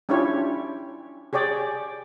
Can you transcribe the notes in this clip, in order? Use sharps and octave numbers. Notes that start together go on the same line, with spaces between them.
C#4 D4 E4 F4 G4 C#5
G4 G#4 C#5 D5 G5